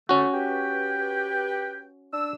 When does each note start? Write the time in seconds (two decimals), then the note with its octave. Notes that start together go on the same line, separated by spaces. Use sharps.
0.09 F2 D3 A3 C#4 F#4
0.34 G4 B4 G5
2.13 D4 E6